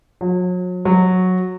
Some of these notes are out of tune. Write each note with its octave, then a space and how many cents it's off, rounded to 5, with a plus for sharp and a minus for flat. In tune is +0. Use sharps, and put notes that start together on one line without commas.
F#3 -40
F#3 -10